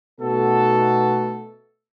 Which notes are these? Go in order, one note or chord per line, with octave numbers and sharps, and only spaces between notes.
B2 A3 B3 D#4 F#4 A4